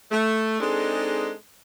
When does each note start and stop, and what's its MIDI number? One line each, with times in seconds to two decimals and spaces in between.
0.11 0.59 57
0.60 1.30 56
0.60 1.30 60
0.60 1.30 62
0.60 1.30 63
0.60 1.30 68
0.60 1.30 69